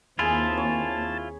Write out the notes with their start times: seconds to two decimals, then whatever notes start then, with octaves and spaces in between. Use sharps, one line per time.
0.19 D#2 C4 E4 F4 G#4 G#5 A5 B5
0.58 C#5